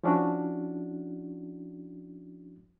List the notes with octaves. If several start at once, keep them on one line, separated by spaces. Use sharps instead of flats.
F3 C#4 D4 E4 F#4